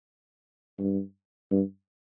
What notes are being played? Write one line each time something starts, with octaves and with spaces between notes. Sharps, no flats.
G2
G2